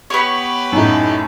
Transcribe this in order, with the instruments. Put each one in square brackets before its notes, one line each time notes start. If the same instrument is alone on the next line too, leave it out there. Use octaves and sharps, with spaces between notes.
[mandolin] B3 C#5 [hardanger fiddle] G4 B4
[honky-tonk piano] F#2 A2 [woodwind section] D#4